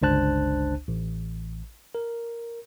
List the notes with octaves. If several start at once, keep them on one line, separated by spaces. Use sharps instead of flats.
G1 C#2 D4 C5 A5 F#6
A1
A#4